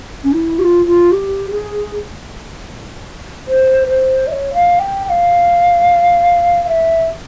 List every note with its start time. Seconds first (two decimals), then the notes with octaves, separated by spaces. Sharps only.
0.24 C#4
0.32 E4
0.59 G4
0.63 F4
0.85 F4
1.11 G4
1.50 G#4
3.48 C5
3.88 C5
4.27 E5
4.32 C#5
4.53 F5
4.79 G5
5.06 G5
5.09 F5
6.63 F5
6.67 E5